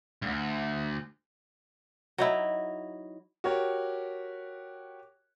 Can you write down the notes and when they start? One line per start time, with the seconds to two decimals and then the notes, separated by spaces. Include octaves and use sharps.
0.22 D2 G2
2.18 F#3 D#4 E4
3.44 F#4 G4 A#4 C#5